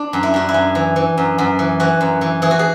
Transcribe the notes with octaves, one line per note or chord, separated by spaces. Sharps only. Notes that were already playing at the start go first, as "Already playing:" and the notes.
Already playing: D4
F#2
E4
F#2 F#4
E4
F#2
E3
E3
F#2
F#2
E3
E3 F#4
F#2
E3
E3 G#4
F#4
G#4